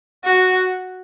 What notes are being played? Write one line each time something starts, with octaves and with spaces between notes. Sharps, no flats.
F#4